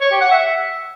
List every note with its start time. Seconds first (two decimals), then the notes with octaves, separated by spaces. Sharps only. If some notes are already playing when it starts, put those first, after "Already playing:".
0.01 C#5
0.11 G4
0.21 F#5
0.31 E5